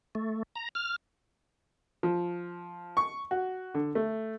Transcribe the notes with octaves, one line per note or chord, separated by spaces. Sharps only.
A3
A#5
F6
F3
C#6
F#4
D3
A3